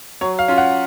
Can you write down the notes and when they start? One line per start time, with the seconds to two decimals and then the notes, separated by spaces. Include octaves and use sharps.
0.21 F#3 C#5
0.39 F5
0.48 C#4 F4
0.58 F#5